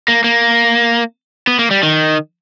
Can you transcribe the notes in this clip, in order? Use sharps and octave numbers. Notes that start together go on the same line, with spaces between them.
A#3
A#3
B3
A#3
G3
D#3